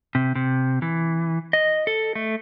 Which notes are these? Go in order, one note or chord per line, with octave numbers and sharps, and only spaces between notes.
C3
C3
E3
D#5
A4
A3